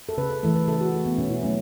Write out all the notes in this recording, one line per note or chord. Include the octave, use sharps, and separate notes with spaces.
A4
C#3 B4
A4
E3 A3 A4
B4
C#3 A4
F#4
A3 E4
B3
B2 C#4
E4
F#3 A3 C#4